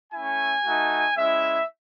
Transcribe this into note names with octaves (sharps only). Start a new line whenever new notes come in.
A3 C#4 E4 G#5
A3 D#4 F#4
G#3 C#4 E4 E5